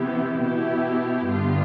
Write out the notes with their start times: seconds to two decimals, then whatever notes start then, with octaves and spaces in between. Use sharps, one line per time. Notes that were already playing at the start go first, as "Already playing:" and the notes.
Already playing: C3 E3 B3 E4 G4
0.38 B2 B3 E4 G4
1.27 G2 D3 G3 B3 F4